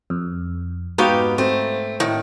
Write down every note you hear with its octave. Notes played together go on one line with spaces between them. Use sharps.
F2
G#2 B3 D#4 F#4 G4 F5
A3 C4
A2 D#3